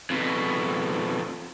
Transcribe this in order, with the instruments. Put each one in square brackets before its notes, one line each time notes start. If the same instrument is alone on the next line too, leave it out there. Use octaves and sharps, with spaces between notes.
[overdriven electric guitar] F2 B2